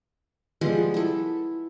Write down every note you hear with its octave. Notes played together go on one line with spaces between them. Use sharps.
F3 G3 G#3 B3
E4 A4